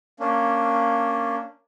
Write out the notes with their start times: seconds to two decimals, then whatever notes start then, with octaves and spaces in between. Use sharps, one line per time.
0.20 A#3 C#4 D4